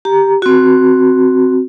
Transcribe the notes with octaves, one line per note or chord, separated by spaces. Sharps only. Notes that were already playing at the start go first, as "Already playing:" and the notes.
G4 A#5
C4 F#4